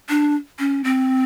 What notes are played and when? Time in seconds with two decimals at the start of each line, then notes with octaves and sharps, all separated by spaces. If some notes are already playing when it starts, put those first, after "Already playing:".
0.09 D4
0.59 C#4
0.84 C4